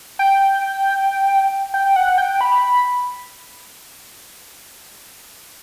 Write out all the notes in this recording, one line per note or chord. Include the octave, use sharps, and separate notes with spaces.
G5
G5
F#5
G5
B5